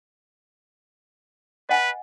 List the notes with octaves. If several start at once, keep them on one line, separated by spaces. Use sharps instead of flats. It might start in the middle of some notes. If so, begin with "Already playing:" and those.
B4 D#5 F#5 G#5